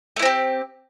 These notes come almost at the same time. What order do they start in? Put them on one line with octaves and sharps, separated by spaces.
A3 E4 C4 G4